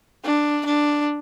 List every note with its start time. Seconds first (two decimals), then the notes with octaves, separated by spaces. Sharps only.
0.25 D4
0.66 D4